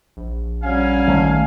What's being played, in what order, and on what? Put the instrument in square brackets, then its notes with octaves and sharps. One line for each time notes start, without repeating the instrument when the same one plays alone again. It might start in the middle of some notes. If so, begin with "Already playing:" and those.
[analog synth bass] A#1
[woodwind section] F#3 G3 C#4 [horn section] F5 G#5
[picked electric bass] D#3 A3